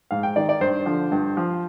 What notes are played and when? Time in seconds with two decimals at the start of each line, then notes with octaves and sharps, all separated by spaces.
0.11 G#2 F5
0.23 G5
0.36 D#3 D5
0.49 D5
0.61 G2 C5
0.86 D3 F3
1.12 G2
1.37 F3